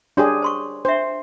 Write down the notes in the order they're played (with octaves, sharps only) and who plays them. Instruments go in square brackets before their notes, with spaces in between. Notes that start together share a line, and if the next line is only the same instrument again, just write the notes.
[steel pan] D4 G4 G#4 [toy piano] A#4 C#5 C6
[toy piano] C5 C6 C#6
[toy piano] D4 E5 [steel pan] C5